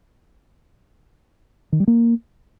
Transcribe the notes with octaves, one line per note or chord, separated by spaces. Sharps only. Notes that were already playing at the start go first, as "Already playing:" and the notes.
D#3
G3
A#3